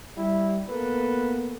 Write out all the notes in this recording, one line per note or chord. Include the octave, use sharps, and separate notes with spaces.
G3 E4
A#3 B3 A4 B4